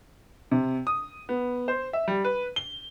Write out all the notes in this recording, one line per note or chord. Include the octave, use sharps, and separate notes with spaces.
C3
D#6
B3
C5
E5
G3
B4
G7